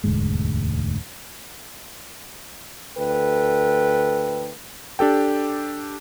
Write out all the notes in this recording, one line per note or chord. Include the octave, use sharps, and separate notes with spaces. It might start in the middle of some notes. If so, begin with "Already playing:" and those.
E1 D2 G#2 G#3
D2 A4 B4 G5
D4 G4 A4 G5